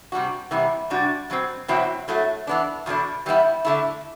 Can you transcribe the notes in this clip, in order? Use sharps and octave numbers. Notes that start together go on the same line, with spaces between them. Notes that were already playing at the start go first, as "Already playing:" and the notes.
C3 G3 D4 F#4
C3 E3 G3 B3 E4
C3 G3 D4 F#4
B2 F#3 C4
E2 B2 F#3 C4 E4
A2 F#3 A3
E3 B3 D4
E2 B2 A3 D4
E3 G3 B3 E4
D3 A3 E4